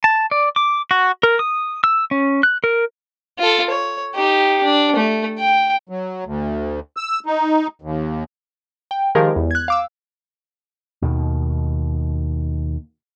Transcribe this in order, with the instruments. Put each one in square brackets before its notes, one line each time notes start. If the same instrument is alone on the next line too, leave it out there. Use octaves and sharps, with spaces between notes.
[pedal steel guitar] A5
D5
D6
F#4
A#4
D#6
E6
C#4
F#6
A#4
[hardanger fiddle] F4 A4
C#5
D#4 G4
D4
A3
G5
[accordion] F#3
D2
E6
D#4
D#2
[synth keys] G5
D#3 F3 G#3 G4 G#4 A#4
E2
F#6 G#6
F5 D6 E6
[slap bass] D#2 B2 D#3